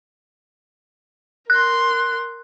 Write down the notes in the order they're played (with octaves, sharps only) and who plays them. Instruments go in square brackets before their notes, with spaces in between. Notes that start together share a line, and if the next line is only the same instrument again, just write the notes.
[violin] A#4 C6 [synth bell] F#6